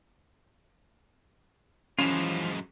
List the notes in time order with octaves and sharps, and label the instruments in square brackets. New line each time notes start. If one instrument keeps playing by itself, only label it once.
[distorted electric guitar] F#2 G#3 [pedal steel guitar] E3 F3 F4 [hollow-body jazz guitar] C#4 B5